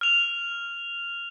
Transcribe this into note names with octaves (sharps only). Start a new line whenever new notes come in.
F6 F7